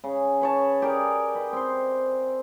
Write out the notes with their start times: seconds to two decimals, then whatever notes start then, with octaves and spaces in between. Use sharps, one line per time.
0.04 C#3
0.41 B4 C#5 A5
0.82 G4 G#4 A#4 D5
1.35 B4 D#5
1.53 C4 C5